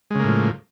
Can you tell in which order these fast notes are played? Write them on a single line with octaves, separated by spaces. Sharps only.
G#3 C#3 A#3 A2 F3